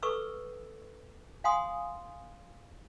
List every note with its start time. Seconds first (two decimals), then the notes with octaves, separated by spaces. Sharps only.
0.03 A4 B4 C#6 D6 E6
1.44 F5 F#5 G#5 C6 D#6